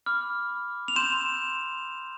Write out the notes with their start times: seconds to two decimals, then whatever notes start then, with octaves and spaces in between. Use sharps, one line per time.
0.06 B5 D6 F6
0.88 F7
0.96 C6 E6 G6 E7